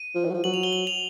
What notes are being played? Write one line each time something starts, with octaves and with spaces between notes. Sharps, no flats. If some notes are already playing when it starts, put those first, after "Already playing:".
Already playing: D#7
F3
E3
F#3
F3
F#3 F#7
F7
G7
F#7
F7